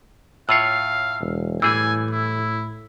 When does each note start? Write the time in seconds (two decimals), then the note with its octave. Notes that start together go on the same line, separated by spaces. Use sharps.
0.49 A2 F4 C#5 F5 E6 C7
1.20 E1
1.62 A2 E3 G3 G#4 G#5 E6
2.11 E4